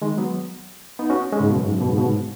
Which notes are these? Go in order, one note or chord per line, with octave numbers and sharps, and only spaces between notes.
D#3 G#3
F#3 B3
B3 D#4
C#4 F#4
G#3 C#4
G#2 C#3
B2
F#2
G#2
F#2
B2
G#2 C#3
B2
G#2